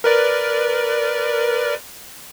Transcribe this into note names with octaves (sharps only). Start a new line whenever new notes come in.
A#4 B4 D5